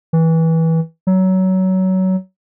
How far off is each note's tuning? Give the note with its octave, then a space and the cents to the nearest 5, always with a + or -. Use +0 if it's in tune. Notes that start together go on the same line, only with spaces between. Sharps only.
E3 -20
F#3 +20